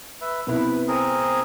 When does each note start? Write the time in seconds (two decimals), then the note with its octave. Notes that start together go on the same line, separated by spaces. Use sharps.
0.21 B4 E5
0.47 C3 B3 E4 B4
0.88 C4 G#4 A#4